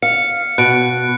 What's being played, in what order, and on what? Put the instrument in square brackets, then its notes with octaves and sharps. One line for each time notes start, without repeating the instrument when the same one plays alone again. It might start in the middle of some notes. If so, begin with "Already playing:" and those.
[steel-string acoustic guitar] F5 [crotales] C#7
[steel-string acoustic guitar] B2 [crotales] F#6 D7